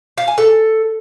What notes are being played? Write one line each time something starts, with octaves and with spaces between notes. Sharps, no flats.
F5
G#5
A4